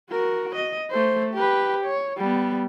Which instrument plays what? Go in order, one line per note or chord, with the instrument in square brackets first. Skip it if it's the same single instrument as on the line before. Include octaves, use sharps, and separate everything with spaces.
[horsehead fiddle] F#4 A#4
D#5
A3 C5
G4 B4
C#5
G3 B3